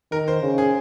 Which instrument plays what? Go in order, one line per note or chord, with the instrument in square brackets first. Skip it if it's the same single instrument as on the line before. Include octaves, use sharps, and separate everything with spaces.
[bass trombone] D#3 [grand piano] A#4
[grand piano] C5
[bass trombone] C#3
[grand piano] G#4